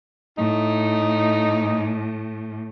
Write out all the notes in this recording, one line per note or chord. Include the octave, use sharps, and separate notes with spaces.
A2 D#4